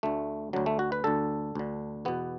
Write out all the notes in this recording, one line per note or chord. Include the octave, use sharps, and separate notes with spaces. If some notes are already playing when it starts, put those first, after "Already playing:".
D2 D3 A3
D2 D3 F#3
A3
F#4
B4
D2 D3 A4
D2 D3
E2 B2 B3